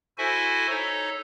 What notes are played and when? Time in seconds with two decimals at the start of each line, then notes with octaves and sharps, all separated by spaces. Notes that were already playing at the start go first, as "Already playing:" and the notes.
0.18 E4 F#4 A4 C5 E5 G#5
0.70 D#4 A4 C#5